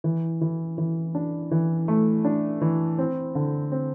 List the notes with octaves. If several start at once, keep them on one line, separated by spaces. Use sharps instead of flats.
E3
E3
E3
D4
E3
A3
D4
E3
C4
D3
C4